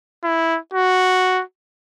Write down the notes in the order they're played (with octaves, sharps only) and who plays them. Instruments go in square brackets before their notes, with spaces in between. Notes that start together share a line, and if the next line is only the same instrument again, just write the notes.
[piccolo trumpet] E4
F#4